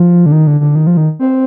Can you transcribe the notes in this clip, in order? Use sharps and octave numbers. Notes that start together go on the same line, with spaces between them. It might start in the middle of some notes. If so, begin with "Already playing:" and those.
Already playing: F3
D3
D#3
D3
D3
D#3
F3
D#3
C4